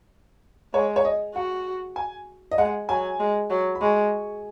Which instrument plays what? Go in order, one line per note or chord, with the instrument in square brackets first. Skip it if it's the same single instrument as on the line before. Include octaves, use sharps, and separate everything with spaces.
[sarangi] G#3 [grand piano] C#5
[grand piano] C#5
D#5
[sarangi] F#4 [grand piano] F#5
[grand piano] G#5
D#5
[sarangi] G#3 [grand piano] F#5
[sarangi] F#3 [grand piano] G#5
[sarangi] G#3
F#3
[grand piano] B5
[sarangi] G#3 [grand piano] C#6